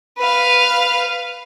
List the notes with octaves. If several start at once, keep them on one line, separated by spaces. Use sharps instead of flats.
B4 F5